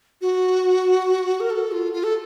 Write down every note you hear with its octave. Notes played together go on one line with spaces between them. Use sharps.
F#4
A#4
A4
F4
F4
A4